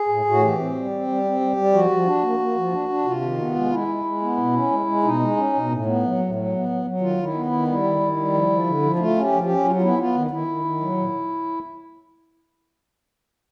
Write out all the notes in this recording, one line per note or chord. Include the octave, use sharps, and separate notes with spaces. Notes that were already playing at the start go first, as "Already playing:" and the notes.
Already playing: G#4
A2
A2 F#4
E3 G4
C4
G3
C4
G3
C4
G3
G3
F3 F#4
F3
D4
A#3
A#3
F3
D4
D4
C3 F4
D#3
B3
G#3
G#3 E4
G#3
G#3
B3
B2
C#4
G#3
G#3
B2 D#4
G#3
C#4
B2
A2
B3
F#3
A2
F#3
B3
F#3
F#3
D#3 F4
D#3
E4
B3
E4
D#3
G3 E4
D#3
D#3
G3
F3
F3
D3
F3
E4
A3 F4
C#4 G4
F3
G4
C#4
F#3 F4
F4
B3 E4
B3 F4
D#3
D#3 E4
D#3
D#3
F#3
A#2